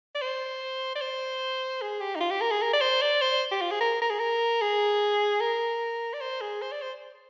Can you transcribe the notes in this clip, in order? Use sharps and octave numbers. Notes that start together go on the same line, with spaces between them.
D5
C5
D5
C5
G#4
G4
D#4
F4
G4
A#4
G#4
A#4
D5
C5
D5
C5
G4
F4
G#4
A#4
A#4
G#4
A#4
G#4
A#4
D5
C5
G#4
C5
D5
C5